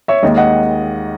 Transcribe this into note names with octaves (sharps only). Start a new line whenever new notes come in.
C#5 E5
D#2 D#3 G#3 D#5
D#5 F#5